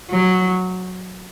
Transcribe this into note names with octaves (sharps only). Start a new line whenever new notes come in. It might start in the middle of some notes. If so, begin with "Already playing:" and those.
F#3